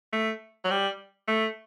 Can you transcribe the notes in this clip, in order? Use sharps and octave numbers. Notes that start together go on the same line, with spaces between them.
A3
F#3
G3
A3